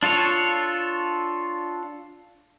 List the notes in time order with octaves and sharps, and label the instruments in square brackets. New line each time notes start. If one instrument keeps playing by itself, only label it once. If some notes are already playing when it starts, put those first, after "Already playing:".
[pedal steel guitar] D4 F4 A4 C#5